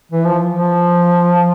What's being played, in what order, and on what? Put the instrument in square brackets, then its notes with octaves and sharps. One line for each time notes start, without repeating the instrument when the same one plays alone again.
[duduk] E3
F3
F3